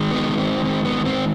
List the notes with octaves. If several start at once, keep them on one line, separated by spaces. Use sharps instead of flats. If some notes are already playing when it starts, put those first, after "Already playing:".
Already playing: D#3 G#3
B3
C4
C4
B3
C4